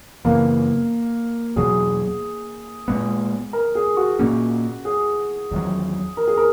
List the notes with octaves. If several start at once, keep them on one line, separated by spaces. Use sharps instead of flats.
F#2 C#3 E3 A#3 B3
E2 B2 F#3 G#4
A#2 G#3 B3
A#4
G#4
F#4
A#2 A#3 C#4
G#4
E2 D#3 F#3
A#4
G#4
A#4